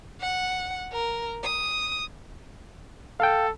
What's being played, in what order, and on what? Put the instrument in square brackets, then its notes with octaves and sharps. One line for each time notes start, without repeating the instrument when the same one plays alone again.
[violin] F#5
A#4
D#6
[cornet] A4 [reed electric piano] F5 G5